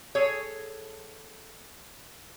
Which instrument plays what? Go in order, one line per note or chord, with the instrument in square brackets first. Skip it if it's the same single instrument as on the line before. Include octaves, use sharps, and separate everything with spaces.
[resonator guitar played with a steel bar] G#4 A4 C#5